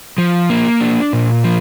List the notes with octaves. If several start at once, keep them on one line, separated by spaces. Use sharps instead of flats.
F3
A#3
D4
A#2
F3